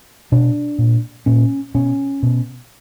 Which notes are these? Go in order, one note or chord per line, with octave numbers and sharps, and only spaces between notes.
B2 D4
A#2
A#2 C#4
B2 C#4
B2